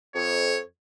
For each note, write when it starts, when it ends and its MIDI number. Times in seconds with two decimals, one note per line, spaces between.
0.15 0.60 41
0.15 0.60 73